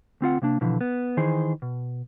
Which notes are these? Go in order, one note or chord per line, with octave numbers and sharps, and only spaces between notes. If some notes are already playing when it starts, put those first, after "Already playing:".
D2 C4 F4 F#5
C3 A#3 D4
B2 D3 E3 F3
B3
D#3 E3 G#4 C5
B2